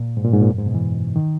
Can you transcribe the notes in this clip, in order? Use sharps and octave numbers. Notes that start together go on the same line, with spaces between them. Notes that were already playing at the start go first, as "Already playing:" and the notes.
Already playing: A#2
G#2
A#2
G#2
A#2
F#2
G#2
B2
E3
D#3